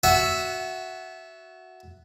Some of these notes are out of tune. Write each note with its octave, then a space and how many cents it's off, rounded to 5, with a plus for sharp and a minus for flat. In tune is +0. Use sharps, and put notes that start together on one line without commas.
F#4 +0 E5 +0 A5 -40